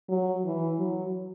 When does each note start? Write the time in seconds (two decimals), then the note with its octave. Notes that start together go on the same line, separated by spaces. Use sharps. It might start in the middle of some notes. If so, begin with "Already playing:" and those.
0.09 F#3
0.44 E3
0.79 F#3